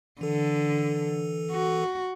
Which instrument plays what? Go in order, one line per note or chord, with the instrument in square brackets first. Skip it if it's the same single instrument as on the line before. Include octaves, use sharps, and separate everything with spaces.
[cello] D3 [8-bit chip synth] E3 A4
[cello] F#4